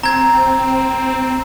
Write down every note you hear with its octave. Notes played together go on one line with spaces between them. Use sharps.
C4 A#5 G#6